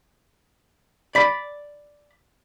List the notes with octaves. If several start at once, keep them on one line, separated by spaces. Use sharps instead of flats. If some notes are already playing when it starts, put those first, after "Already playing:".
D5 B5